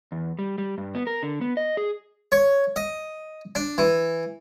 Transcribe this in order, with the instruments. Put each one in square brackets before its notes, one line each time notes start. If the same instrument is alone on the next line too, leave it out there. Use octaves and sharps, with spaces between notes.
[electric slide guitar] E2
G3
G3
G2
B3
A#4
D3
B3
D#5
G#4
[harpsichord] C#5
D#5
D4
E3